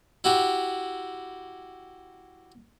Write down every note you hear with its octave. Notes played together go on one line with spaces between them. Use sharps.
E4 F#4 G4